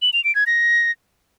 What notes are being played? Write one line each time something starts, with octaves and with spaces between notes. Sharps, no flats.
F#7
F7
D7
G#6
A#6